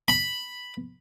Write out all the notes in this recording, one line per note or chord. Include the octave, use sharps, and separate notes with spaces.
B5